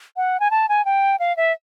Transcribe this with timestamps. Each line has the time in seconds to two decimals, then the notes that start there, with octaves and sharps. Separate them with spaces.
0.17 F#5
0.40 G#5
0.51 A5
0.69 G#5
0.85 G5
1.20 F5
1.37 E5